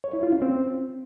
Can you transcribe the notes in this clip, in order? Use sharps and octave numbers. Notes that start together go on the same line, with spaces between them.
C#5
E4
F4
C#4
C4